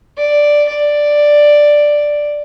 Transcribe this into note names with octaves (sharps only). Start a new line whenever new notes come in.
D5
D5